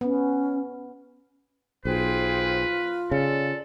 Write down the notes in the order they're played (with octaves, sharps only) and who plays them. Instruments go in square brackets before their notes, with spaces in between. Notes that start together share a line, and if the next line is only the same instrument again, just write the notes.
[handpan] B3 [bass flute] C#4
[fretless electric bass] B1 [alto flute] F4 [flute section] G#4 C5 G5 [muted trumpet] B4
[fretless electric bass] C#3 [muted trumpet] A4 [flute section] D5